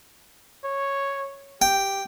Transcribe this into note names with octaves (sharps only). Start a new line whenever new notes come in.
C#5
G4 G5